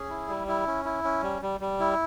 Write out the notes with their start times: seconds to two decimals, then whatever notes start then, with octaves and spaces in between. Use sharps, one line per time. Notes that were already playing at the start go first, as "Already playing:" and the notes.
Already playing: C#4 G#4
0.09 E4
0.28 G3
0.48 E4
0.66 C#4
0.85 E4
1.04 C#4
1.22 G3
1.42 G3
1.60 G3
1.80 E4